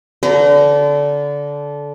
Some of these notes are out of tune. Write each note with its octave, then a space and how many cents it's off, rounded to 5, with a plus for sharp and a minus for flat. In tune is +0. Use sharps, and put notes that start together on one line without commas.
D3 -20 C5 -45 A#5 +0